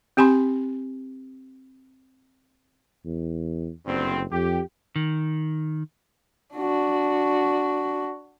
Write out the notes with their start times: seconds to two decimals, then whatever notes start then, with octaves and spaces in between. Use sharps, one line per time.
0.17 C4 G4 G#5 B5 C6
3.05 E2
3.86 F#1 D2 G2 C4
4.31 F2 G4
4.96 D#3
6.55 D4 F#4